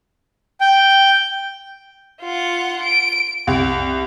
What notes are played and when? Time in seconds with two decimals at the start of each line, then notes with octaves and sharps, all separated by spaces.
0.61 G5
2.21 F4 F#5
2.83 D7
3.47 C2